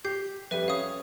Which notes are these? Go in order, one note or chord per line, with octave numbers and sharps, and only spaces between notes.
G4 G6 C7
F2 G3 B4 E5 D#7
C#4 F5 D#6